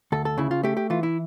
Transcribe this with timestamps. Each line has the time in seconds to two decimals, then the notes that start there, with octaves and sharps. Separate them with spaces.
0.12 D2 A4
0.25 A4
0.38 C#3 E4
0.51 F4
0.63 A3 G4
0.77 G4
0.90 E3 F4
1.03 E4